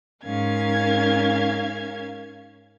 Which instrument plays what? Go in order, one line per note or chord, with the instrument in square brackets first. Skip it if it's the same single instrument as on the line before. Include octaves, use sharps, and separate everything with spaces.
[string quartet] G#2 C#4 A#4 F5 G#6